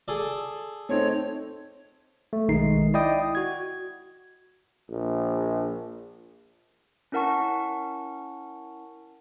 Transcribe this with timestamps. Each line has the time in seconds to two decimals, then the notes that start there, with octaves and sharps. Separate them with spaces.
0.08 G#4 A4 D5
0.89 A3 C4 D#4 C#5
2.33 A3
2.48 B1 D#3 G#3 D#4 C7
2.94 E4 D5 D#5 G5 D#6
3.35 F#4 G#6
4.90 A#1
7.12 C#4 E4 A#4 F#5 A5 C#6